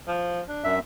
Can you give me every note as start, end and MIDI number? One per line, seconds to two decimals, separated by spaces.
0.08 0.40 53
0.49 0.75 62
0.64 0.79 42
0.64 0.79 76